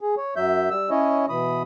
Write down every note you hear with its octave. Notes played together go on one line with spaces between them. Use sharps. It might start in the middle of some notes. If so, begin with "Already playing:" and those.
G#4
C#5
F#2 F#3 E5 G6
G3 E6
C#4 E4 C#5 D#5
B2 E3 B5 D#6